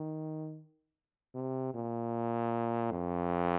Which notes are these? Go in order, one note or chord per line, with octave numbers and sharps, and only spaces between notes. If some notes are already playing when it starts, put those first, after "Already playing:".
Already playing: D#3
C3
A#2
F2